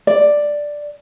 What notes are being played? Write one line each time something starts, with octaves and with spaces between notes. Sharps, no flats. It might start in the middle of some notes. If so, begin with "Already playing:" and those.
D5